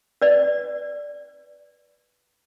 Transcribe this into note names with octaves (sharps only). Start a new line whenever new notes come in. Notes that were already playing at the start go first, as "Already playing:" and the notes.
B4 D5